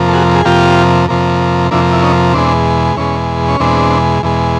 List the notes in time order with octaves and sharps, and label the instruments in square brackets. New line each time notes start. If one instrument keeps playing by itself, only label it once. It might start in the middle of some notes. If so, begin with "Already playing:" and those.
Already playing: [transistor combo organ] F2 C3 F3 A#3
A4
F#4 G#4
G#4
F2 C3 F3 A#3 F4 G4
F2 C3 F3 A#3
F2 C3 F3 A#3 D4 E4
E4
C#4 D#4
E2 B2 G#3 C4 D4
E2 B2 G#3 C#4
C#4
E2 B2 G#3 C4 D4
E2 B2 G#3